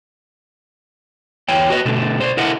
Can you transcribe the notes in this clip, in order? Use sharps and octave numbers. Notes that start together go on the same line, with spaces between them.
E2 C#5 G5
F#4 B4 D#5
B2 D3 A3
C5 D5
D3 E4 A#4 D#5 E5 F#5